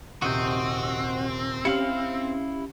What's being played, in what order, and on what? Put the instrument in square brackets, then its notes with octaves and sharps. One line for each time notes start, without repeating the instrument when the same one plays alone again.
[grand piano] D#1 C3 [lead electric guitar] C4 [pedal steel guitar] F#4 D#5 G6
[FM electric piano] C#4 G4 [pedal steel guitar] E4 F5 F6 [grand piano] C#7 F#7